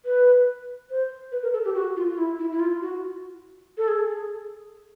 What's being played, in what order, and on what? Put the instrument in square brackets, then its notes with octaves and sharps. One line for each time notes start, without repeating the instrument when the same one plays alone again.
[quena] B4
C5
B4
A#4
A4
G4
F#4
F4
F4
E4
E4
E4
F4
F#4
A4
G#4